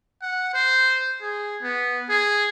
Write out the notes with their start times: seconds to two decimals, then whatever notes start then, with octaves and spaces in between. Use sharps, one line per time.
0.22 F#5
0.53 C5
1.21 G#4
1.62 B3
2.09 G#4